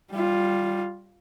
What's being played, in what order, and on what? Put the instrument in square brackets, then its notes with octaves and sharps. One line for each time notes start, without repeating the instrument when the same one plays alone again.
[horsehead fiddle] G3 F4